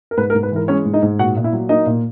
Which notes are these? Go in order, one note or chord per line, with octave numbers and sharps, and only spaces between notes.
A#4
G#2 B4
A#4
G#2
B4
E3 A#4
G#3 C#4 C#5
G#2
D#4 D#5
G#2
A#2 F#4 F#5
A#2
E4 E5
F#3
A#3 D#4 D#5
A#2